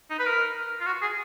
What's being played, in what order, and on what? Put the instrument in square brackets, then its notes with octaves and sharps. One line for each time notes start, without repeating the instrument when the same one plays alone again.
[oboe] D#4
B4
A#4
F4
F#4
G#4